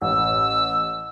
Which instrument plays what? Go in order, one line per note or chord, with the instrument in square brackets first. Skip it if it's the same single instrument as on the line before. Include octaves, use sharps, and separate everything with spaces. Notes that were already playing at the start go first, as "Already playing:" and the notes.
[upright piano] A1 [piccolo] E6